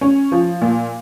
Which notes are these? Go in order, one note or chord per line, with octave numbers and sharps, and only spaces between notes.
C#4
F3
A#2